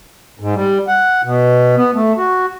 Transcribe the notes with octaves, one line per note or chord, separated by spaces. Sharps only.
G#2
G3
F#5
B2
B3
A3
F#4